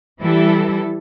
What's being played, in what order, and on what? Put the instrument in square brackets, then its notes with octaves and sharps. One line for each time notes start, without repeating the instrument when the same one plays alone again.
[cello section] E3 G3 E4 A4